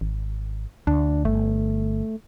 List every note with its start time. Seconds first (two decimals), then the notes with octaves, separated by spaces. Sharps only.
0.01 G#1
0.87 D2 D4
1.25 G1 A3